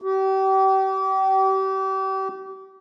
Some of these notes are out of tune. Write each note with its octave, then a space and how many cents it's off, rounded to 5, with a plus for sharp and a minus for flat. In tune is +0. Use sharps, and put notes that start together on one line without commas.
G4 -35